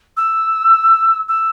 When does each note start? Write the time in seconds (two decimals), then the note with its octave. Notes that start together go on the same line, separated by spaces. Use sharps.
0.17 E6
1.29 E6